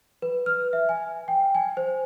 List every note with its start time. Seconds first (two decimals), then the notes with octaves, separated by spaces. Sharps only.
0.22 B4
0.46 F6
0.73 E5
0.89 G#5
1.28 G5
1.55 G#5
1.77 C5